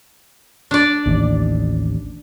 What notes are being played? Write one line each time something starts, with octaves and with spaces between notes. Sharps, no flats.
D4 D5
A1 D#2